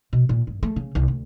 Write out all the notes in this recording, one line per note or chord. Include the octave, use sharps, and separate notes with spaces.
B2
A#2
G2
A3
C#3
C2
D2